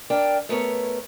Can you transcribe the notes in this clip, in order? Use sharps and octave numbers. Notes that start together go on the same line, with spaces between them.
D4 A#4 G5
A3 B3 A#4 C#5